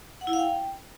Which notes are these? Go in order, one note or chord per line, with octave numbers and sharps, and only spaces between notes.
F#5
E4
F5
G5